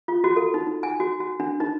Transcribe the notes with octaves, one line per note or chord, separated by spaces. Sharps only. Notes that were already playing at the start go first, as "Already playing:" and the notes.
F4
F#4
A4
D#4
D#4
G#5
F#4
F#4
D4
D#4